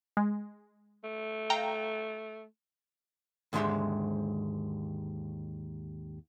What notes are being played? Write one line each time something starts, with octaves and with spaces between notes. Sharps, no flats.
G#3
A3
F5 G5 A#5
D#2 G#2 D3 G#3 E5 C6